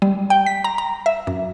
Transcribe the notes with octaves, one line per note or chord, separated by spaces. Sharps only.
G3
G5
B6
A#5
A#5
E5
F#2